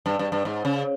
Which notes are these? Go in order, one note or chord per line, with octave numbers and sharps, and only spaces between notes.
G2
G2
G2
G#2
C#3